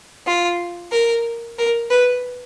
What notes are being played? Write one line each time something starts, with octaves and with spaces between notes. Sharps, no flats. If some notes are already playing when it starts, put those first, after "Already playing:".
F4
A#4
A#4
B4